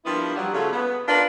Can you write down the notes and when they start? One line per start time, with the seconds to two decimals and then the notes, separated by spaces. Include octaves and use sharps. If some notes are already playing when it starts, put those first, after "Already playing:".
0.05 F3 G3 A#3 B3 D4 E4
0.35 F#3 G3
0.53 C#3 F3 F#3 A3 F4 A4
0.71 B3
1.07 D4 D#4 F4 A#4 B4